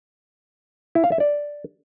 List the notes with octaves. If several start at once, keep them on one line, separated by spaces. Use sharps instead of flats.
E4
F5
E5
D5